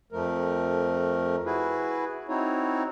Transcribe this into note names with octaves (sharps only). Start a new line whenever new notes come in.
F2 F3 A3 A#4
E4 F#4 G#4 B4
C4 D#4 E4 F#4 C#5